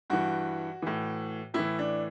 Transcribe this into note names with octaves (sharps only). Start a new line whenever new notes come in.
G2 E3 F#4
A2 E3
A2 E3 E4
D4